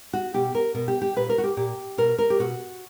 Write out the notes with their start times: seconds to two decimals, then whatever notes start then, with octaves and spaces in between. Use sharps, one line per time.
0.13 F#4
0.34 B2 G4
0.55 A#4
0.74 B2 A#4
0.88 G4
1.02 G4
1.16 A#2 B4
1.29 A#4
1.38 F#4
1.44 G4
1.57 A#2 G4
1.98 B2 A#4
2.18 A#4
2.30 G4
2.39 B2 F#4